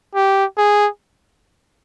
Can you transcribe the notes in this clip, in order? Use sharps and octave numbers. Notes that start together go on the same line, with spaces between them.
G4
G#4